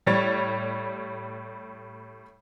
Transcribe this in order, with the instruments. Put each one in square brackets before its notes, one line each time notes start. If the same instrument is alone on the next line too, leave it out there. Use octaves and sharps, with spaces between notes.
[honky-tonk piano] A2 G3 C#5 A6